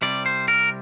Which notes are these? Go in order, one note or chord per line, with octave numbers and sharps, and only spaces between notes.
C2 C3 G3 D5
C5
A#4